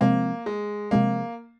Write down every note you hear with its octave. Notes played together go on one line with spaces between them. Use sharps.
C3 F3 G#3 A#3 C4
G#3
C3 F3 G#3 A#3 C4